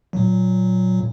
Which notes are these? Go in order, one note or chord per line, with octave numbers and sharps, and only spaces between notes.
A#2 F#3